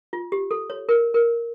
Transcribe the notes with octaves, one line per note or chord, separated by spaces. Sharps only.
F4
G4
A4
C#5
A#4
A#4